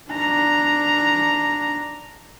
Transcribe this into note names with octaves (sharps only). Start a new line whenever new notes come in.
D4 A#5